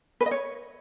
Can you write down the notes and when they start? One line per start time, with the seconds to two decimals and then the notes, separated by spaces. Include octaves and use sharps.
0.21 B4
0.26 D#5
0.31 C#5